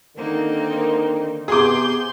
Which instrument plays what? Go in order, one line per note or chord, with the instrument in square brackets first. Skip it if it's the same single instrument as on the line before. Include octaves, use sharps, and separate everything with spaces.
[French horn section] D3 D#3 A#4 [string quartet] A#3 C4 D#4
[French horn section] C3 B3 [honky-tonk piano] G#4 D6 [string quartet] C6 G6